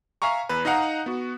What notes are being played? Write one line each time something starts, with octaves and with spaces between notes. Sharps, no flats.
E5 F5 G#5 A#5 C#6
E2 B4
D#4 D#5 F5 F#5 A#5
B3 F#4